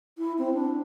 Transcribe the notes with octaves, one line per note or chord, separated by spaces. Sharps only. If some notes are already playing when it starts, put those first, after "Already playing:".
E4
C4
D4